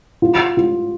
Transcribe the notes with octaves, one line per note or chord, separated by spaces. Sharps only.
F4
F4